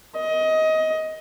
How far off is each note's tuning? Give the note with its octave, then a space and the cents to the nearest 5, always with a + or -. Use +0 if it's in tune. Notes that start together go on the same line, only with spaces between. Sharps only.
D#5 +20